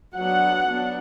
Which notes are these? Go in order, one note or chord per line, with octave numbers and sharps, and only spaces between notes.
F#3 B3 D4 F#5
F#3 B3 D4